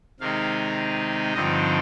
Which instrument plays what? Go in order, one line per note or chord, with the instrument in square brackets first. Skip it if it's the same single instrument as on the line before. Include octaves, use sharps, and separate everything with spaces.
[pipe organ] C3 D#3 G#3 D#4 F5
G2 D3 F3 C4 D#4 D#5